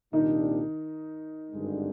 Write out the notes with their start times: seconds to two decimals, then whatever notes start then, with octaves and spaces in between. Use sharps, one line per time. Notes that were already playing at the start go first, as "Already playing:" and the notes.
0.13 C2 A#2 D#3 G3 D4 D#4
1.50 G#1 G2 D3 G#3